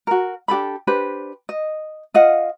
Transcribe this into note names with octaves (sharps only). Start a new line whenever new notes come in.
F#4 A#4
D4 G4 A4 B5
D4 G4 B4 C5
D#5
F4 D#5 F5 F#5